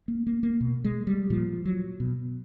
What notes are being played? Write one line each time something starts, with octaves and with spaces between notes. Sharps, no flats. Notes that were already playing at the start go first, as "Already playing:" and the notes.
A#3
A#3
A#3
B2
G#3
G3
A#2 F3
F#3
B2